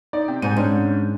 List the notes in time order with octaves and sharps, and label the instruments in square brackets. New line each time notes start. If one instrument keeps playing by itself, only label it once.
[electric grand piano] D#4 [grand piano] D5
[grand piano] C3 [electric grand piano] G5
[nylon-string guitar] G#2 [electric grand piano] G#5 G6 D#7
[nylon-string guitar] G#2 [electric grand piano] C#4 D4 C#5